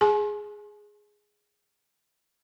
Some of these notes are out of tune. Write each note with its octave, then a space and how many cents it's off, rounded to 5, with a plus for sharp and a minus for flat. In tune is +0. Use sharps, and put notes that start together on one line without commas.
G#4 +0 G#5 +35 C6 +40